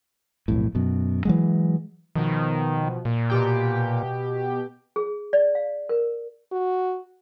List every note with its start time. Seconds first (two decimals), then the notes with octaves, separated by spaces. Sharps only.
0.48 B1 F2 A2
0.75 F#2 B2
1.25 E3 F#3 G#3
2.15 B2 D#3 F3
3.05 A#2
3.30 B2 G4 G5
4.96 G#4
5.33 D5
5.55 F5
5.89 A#4
6.52 F#4